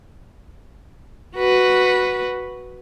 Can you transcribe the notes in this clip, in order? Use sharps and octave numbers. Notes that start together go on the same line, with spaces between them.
F#4 B4